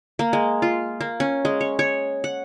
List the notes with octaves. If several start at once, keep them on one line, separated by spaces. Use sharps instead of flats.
A#3
G#3
F4
A#3
C#4
G#3
C#5
C#5
F#5